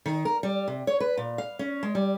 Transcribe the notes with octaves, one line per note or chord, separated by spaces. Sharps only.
D#3
A#4
G3
C3
C#5
B4
A#2
F5
C#4
G#3
G3